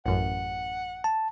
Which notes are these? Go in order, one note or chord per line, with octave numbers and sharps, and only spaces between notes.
A1 F#2 F#5
A5